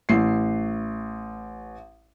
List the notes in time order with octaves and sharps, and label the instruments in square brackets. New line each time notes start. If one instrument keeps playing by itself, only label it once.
[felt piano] A1 C7